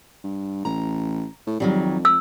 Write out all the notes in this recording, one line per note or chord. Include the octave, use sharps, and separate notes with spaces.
G2
A1 A#5
A2
F2 D#3 F#3 G3
E6